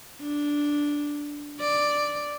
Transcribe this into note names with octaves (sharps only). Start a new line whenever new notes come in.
D4
D5